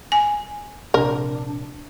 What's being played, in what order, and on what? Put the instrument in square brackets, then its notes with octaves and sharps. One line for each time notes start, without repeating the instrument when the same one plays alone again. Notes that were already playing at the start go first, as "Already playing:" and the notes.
[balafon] G#5
[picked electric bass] A#1 C3 [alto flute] D4 [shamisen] A#4